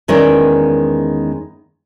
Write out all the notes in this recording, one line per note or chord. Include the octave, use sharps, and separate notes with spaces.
E2 D#3 G#3 C#4 D5